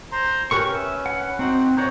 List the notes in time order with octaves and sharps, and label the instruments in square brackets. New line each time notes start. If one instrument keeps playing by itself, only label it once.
[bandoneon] C5 A#5 C6
[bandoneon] C#4 B4 [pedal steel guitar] G4 A#4 C#6
[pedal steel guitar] E5
F#5
[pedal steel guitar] C4 [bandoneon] D#4 F#4 F#5
[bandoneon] A#2 F#5 A#5 [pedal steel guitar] D#4 C5 C#5